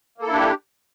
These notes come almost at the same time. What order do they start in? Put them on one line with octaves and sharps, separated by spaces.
A#3 A4 E4 D4 G4